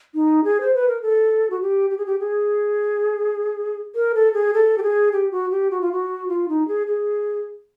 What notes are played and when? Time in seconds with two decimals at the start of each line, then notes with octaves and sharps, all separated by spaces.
0.15 D#4
0.44 G#4
0.61 C5
0.75 B4
0.88 A#4
1.02 A4
1.50 F#4
1.62 G4
1.90 G4
1.98 G#4
2.06 G4
2.20 G#4
3.95 A#4
4.15 A4
4.34 G#4
4.54 A4
4.78 G4
4.83 G#4
5.12 G4
5.31 F#4
5.51 G4
5.71 F#4
5.81 F4
5.92 F#4
6.28 F4
6.49 D#4
6.68 G#4
6.87 G#4